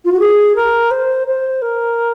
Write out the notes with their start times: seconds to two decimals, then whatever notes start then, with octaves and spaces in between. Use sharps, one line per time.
0.05 F4
0.12 F#4
0.19 G#4
0.55 A#4
0.91 C5
1.27 C5
1.62 A#4